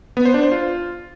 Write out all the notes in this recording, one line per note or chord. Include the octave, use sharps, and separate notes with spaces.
B3
C5
D4
C5
F4